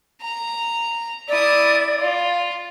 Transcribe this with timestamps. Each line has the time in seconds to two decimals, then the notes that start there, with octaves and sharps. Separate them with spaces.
0.22 A#5
1.28 E4 D5 D#6
1.99 F4